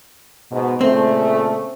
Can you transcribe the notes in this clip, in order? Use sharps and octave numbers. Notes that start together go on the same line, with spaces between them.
G#2 B2
A#2 C#3 A3 C4